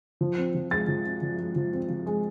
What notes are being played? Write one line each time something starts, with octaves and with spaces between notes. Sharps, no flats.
F3
C4
F3
G#3 A6
F3
C4
F3
G#3
F3
C4
F3
G#3